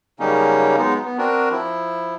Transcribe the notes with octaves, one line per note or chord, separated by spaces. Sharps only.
C#3 F#3 G3 A#3 C#4 D#4
F#3 G#3 B3 D#4
B3
C4 D4 F#4 A#4
F3 E4